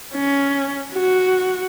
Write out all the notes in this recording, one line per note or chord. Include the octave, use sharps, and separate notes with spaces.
C#4
F#4